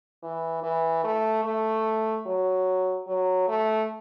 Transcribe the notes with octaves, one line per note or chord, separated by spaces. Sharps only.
E3
E3
A3
A3
F#3
F#3
A3